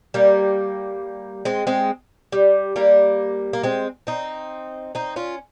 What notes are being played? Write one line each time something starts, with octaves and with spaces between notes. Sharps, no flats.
G3 A#3
G#3 C4
G#3 C4
G3
G3 A#3
A#3
G#3 C4
C4 D#4
C4 D#4
C#4 F4